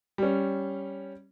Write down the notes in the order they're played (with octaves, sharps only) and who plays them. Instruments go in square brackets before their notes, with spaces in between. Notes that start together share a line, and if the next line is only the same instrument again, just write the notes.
[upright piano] G3 C#4